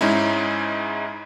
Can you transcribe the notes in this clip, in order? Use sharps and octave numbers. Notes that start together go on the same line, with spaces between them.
G#2 G#3 C#4 D#4 E4